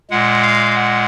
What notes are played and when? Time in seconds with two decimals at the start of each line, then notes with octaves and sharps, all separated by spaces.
0.10 A#2 G#3 F#5
0.42 F5
0.75 F#5